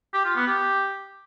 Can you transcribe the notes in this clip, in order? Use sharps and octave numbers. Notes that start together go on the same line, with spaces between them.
G4
F4
B3
G4